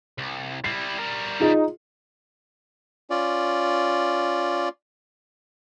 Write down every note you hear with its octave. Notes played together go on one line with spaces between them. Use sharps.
C2
G3 E4 C7
G3 A#4
D#4 F4 G#4 D#5
C#4 F4 D5